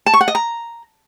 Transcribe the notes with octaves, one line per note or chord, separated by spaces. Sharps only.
A5
C#6
F#5
D#5
A#5